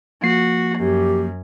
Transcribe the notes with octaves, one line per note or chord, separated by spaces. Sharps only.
F3 A#3 F#4 C7
F#2 G4